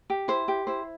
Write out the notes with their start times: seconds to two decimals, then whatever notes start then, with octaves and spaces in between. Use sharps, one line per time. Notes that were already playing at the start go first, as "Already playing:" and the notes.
0.10 G4
0.28 E4 C5
0.48 G4
0.67 E4 C5